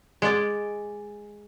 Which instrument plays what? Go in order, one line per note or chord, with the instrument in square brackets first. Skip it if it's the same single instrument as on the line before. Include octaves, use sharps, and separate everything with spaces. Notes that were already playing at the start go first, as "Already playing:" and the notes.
[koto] G#3 D5